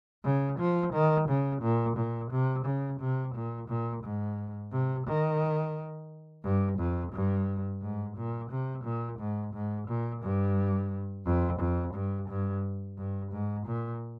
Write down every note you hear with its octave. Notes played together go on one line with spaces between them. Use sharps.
C#3
F3
D#3
C#3
A#2
A#2
C3
C#3
C3
A#2
A#2
G#2
C3
D#3
G2
F2
G2
G#2
A#2
C3
A#2
G#2
G#2
A#2
G2
F2
F2
G2
G2
G2
G#2
A#2